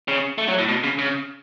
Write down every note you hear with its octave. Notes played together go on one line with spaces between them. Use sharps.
C#3
A3
F#3
A2
B2
C#3
C#3